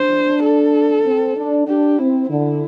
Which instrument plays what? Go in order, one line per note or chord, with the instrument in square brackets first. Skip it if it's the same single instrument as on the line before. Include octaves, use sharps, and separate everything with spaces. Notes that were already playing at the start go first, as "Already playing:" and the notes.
Already playing: [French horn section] D4 [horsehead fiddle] C5
[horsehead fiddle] A4
[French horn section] C4
D4
[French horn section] D4 [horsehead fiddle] G4
[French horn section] C4 [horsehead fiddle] E4
[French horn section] D3 [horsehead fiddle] E4